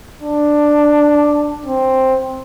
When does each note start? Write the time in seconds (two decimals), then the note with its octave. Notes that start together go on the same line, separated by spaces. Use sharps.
0.22 D4
1.66 C4